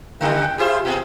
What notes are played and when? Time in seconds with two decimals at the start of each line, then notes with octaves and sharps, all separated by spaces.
0.21 C#3 G3 A#3 E4 G5
0.40 G5
0.58 E4 F4 G4 G#4 C5
0.85 A#2 C4 G#4